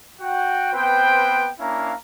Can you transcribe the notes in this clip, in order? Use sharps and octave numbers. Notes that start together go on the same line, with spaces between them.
F#4 F#5 G5
B3 C4 B4 C5 G5
A#3 C#4 D4 E4 F5 A#5